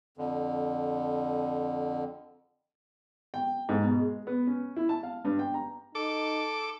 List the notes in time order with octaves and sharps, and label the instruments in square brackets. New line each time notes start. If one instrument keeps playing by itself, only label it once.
[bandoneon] F2 D3
[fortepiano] G5
G#2
B2
G#3
B3
C#4
E4
A5
F5
G2
G5
A#5
[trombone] D#4 [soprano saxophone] A4 [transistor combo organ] D6